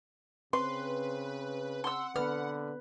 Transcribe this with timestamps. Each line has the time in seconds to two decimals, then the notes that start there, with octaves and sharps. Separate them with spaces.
0.53 C#3 C4 B4 C6
1.84 F#5 C6 E6
2.16 D3 B3 B4 F6